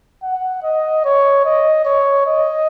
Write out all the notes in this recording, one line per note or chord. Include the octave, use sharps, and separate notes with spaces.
F#5
D#5
C#5
D#5
C#5
D#5